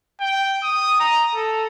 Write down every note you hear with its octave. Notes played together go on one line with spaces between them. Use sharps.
G5
D#6
A#5
A4